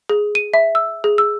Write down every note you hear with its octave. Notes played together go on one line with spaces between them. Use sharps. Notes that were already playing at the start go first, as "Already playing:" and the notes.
G#4
D#7
E5
E6
G#4
E6